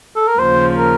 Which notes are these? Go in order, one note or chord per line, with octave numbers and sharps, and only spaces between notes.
A4
A#4
D#2 C#3 F3 C5
A#4